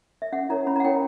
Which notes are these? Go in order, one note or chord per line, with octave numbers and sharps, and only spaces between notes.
E5
C#4 F#5
E4 A#4 C#5 A#5
C#4 B5
A#5
F#5
E4 A#4 C#5 G5